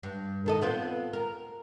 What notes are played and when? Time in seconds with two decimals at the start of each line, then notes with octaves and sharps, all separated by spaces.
0.03 G2
0.46 D#3 A4 D#5
0.61 B3 C4 F4
1.13 A#4